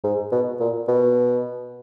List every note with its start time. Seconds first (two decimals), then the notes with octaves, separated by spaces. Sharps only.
0.04 G#2
0.32 B2
0.60 A#2
0.88 B2